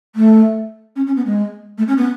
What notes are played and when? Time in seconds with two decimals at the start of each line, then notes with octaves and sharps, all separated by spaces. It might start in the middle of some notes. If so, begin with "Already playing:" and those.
0.15 A3
0.96 C#4
1.07 C#4
1.16 B3
1.26 G#3
1.78 A3
1.88 C#4
1.97 B3